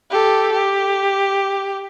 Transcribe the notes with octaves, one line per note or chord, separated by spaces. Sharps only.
G4 A4
G4